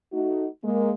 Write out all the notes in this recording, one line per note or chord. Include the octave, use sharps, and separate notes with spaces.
A3 D#4 F#4
G#3 A#3